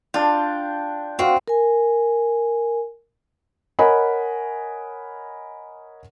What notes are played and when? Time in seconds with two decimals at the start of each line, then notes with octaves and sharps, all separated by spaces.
0.14 D4 F4 G5
1.19 C4 F#4 F5
1.48 A#4 G#5
3.79 A#4 C#5 D#5 F#5 G#5 B5